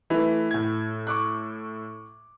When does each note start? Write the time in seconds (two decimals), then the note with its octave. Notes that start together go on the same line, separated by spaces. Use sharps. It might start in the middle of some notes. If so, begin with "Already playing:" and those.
0.10 E3 A3 E4
0.51 A2 G#6
1.07 C#6 D6 F#6